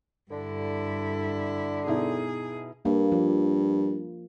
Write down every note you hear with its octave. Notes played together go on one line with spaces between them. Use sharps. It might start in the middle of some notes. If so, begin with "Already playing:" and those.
G2 D3 E4
B2 D#4 E4 G#4
G2 A#3
F3